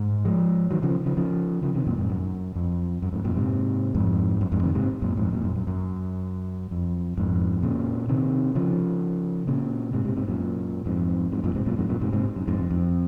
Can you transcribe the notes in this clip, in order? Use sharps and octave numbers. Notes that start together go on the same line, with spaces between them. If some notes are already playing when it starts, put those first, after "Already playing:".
Already playing: G#2
F3 G#3
D#3 F#3
C#3 F3
C#3 F3
C#3 F3
C#3 F3
C3 D#3
F#2 A#2
F2 G#2
F#2
F2
F#2
F2 G#2
F#2 A#2
G#2 C3
F2 G#2
F#2
F2 G#2
C3 D#3
G#2 C3
F#2 A#2
F2 G#2
F#2 A#2
F#2
F#2
F#2
F2
F2 G#2
A#2 C#3
C3 D#3
C#3 F3
A#2 C#3
G#2 C3
G#2 C3
G#2 C3
F#2 A#2
F2 G#2
F2 G#2
F#2 A#2
G#2 C3
F#2 A#2
F2 G#2
F#2 A#2
G#2 C3
G#2 C3
F#2
F2 G#2
F2
F2